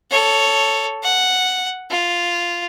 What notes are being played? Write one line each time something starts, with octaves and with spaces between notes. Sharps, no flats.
A4 C#5
F#5
F4